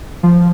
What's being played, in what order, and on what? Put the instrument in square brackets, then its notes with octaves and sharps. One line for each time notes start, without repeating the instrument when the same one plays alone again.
[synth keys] F3